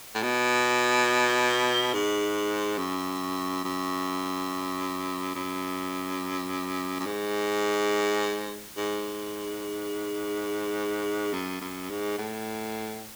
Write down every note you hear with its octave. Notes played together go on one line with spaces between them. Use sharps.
A2
B2
G#2
F#2
F#2
F#2
F#2
G#2
G#2
F#2
F#2
G#2
A2